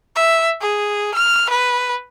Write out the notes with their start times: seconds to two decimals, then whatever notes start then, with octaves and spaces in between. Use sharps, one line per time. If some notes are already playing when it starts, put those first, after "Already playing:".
0.16 E5
0.61 G#4
1.15 F6
1.50 B4